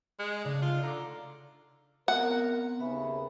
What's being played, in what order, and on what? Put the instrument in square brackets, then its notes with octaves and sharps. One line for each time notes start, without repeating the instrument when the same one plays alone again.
[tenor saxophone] G#3
[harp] C#3 A3 [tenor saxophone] D4
[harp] D#4 A4 C7 [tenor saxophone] F4
[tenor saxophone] D3 [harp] A#5 D6
[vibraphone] B3 C4 [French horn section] A#4 [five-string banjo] F#5
[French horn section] D#2 C#3 [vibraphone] B4 E5 B5